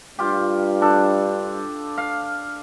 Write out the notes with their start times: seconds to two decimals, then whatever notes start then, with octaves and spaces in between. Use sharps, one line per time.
0.19 G2 F4 G4
0.82 D4 A4
1.98 F5